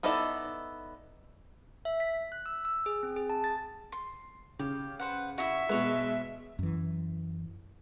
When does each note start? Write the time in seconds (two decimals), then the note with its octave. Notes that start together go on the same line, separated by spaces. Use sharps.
0.03 B3 D#4 E4 A4 D5
1.85 E5
2.00 B6
2.32 F#6
2.46 E6
2.65 E6
2.86 G#4
3.03 C4
3.16 G#4
3.30 A5
3.44 A6
3.92 C6
4.59 C#3 G4
5.00 B4 C5 F#5
5.38 E4 F#4 E5
5.69 B2 G#3 B4 C#5 D#5
6.59 F#2 E3